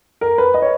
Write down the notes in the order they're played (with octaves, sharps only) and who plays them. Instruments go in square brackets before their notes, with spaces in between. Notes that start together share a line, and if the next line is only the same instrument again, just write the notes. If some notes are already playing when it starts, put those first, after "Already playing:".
[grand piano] A#4
B4
D#5
C#5